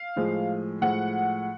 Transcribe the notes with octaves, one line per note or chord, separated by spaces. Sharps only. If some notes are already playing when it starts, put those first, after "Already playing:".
Already playing: F5
A2 F3 G#3
A2 F3 G#3 F#5